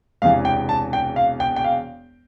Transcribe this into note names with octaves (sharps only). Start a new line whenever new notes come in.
E1 E2 C3 E3 F5
G5
A5
G5
F5
G5
G5
F5